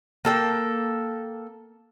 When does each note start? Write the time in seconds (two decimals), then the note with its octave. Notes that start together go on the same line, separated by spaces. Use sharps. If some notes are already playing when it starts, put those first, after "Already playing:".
0.25 A#3 A4 G5